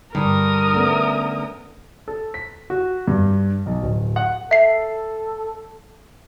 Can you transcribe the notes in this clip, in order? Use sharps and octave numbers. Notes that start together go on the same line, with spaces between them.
G2 D3 A#4 D5 D#6
D3 A3 B3 C#4
A4
B6
F#4
G2
B1
D1
F#5
A4 E5 C7